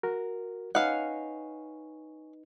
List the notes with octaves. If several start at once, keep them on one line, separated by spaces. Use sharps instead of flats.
F#4 A#4
C#4 D#4 B4 D#5 F5 F#5